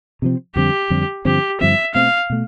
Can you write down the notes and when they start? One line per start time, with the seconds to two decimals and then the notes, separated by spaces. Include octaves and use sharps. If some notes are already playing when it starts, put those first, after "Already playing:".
0.22 C3 F3 C4
0.56 F2 D3 G3 C4 G4
0.90 F2 D3 G3 C4
1.25 G2 D3 F3 C4 G4
1.61 G2 D3 F3 C4 E5
1.95 B2 A3 C4 F5
2.30 B2 A3